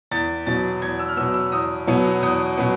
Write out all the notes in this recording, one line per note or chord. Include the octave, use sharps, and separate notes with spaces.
E2 A6
B2 F#3 B3 A6
E2 G#6
E6
F6
B2 F#3 B3 E6
E6
E2 D#6
B2 F#3 B3
E2 D#6
B2 F#3 B3